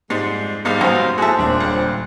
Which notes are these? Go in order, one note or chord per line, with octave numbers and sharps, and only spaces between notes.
F2 G#2 G3 G#3
A#1 G#2 G3 A#3 D#4 F5
F#2 B2 C5
A2 G#3 F#4 E5 G#5 A5
D#1 C4 D4
C#2